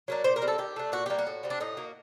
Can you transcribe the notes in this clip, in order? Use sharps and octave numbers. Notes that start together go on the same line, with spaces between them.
F#3 A#3 D4
A#2 C5
A#4
G3 C4
A4
D#3 G4
A3 D4
A#2 F#4
G3 A#3 G4
F#4
A2
G3 C4
D4
A2 D#4
F#3 A#3